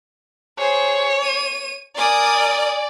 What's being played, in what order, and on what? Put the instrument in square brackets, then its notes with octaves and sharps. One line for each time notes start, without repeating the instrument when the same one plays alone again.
[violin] G#4 C5 [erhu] C#5
[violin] D#7
[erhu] A#4 [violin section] D5 [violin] G#5 D#6